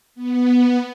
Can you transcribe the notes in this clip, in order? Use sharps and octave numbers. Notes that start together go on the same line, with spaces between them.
B3